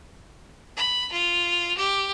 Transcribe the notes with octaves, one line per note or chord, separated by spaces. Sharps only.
B5
F4
G4